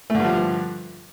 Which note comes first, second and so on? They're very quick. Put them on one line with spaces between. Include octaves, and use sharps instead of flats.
A3 D3 G2 F3